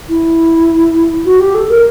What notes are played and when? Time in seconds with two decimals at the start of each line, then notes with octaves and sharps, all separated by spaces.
0.09 E4
1.25 F#4
1.40 G4
1.55 A4
1.69 A#4